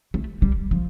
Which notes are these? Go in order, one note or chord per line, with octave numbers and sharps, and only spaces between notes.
A3
G3
F3